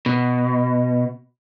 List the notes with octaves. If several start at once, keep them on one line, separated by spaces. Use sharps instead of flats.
B2